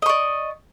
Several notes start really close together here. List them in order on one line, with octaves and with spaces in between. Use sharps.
D#5 C#6 D5